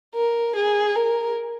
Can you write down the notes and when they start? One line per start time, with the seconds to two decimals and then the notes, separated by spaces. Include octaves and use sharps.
0.15 A#4
0.56 G#4
0.96 A#4